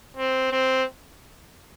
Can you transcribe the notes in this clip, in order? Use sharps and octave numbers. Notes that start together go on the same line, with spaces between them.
C4
C4